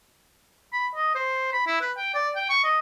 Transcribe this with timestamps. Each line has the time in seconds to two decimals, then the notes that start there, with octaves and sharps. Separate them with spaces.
0.73 B5
0.95 D#5
1.15 C5
1.53 B5
1.67 E4
1.81 B4
1.97 G5
2.14 D5
2.36 G5
2.50 C#6
2.64 D#5